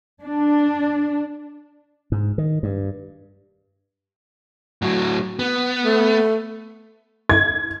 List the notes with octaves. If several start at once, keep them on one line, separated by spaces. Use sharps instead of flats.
D4
G#2
D#3
G2
A2 F#3
B3
A3
G#6